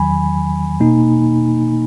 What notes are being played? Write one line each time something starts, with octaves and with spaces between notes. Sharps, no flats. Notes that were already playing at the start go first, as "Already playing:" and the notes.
Already playing: E2 D#3 F#3 G#5 B5
B2 A#3 D#4